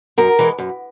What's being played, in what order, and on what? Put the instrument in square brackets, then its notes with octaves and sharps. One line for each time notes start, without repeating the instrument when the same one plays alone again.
[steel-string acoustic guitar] F#2 A#4
E3 G#3
F#2